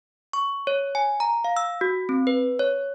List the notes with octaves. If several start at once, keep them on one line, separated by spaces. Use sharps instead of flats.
C#6
C#5
G#5
A#5
F5
E6
F#4
C4
B4
C#5